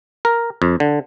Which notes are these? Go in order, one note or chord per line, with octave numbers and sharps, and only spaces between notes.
A#4
F2
D3